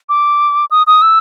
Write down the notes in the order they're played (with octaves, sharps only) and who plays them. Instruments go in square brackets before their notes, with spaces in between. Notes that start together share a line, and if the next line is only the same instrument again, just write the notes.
[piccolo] D6
D#6
D#6
E6